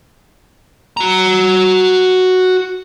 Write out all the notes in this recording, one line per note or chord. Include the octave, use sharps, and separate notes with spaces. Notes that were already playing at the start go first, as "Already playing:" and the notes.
F#4 A#5